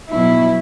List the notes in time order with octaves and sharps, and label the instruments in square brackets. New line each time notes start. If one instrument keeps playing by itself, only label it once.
[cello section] B2 F#3 E4